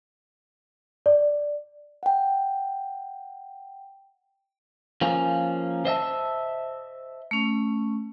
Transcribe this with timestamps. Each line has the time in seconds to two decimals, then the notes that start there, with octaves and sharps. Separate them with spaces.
1.06 D5
2.03 F#5 G5
5.01 F3 A#3 C#4
5.85 C5 D#5 E5 A5
7.31 A3 C#4